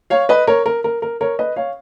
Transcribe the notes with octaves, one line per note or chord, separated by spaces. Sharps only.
C#5 F5
B4 D#5
A#4 C#5
A#4
A#4
A#4
A#4 C#5
B4 D#5
C#5 F5